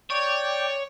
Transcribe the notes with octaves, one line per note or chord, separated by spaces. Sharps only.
C#5 D5 G5